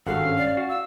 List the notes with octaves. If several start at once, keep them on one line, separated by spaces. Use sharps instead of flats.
G#1 G2 F#4 A4 F5 F#5
C#4
D5
F#4
F5 E6